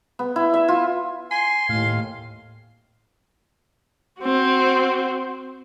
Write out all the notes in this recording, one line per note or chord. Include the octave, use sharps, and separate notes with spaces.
B3
E4
E5
F4
G#5 C6
D#2 A2 F5
C4 F#4